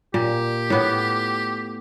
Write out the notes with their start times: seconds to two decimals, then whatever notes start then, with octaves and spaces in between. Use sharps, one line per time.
0.14 A#2 G4
0.70 A2 B3